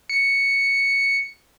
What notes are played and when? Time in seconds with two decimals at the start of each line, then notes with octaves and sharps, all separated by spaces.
0.10 C#7